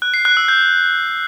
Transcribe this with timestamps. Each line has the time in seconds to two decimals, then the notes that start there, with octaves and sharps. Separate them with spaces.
0.02 F#6
0.14 C7
0.25 F#6
0.37 E6
0.48 G6